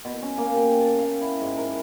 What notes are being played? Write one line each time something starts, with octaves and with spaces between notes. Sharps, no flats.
B2
C#4
A#3
G4
A5
F5
E4
G#2
A#4